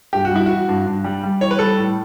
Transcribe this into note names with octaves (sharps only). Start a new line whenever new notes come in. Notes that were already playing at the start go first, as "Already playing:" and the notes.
G2 G4
F#4
G3 E4
E3 F#4
G2
G2
G3
G3
E3 C#5
B4
G3 A4
A2